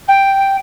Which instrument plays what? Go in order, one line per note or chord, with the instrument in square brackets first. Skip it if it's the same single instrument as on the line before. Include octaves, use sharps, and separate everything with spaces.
[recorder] G5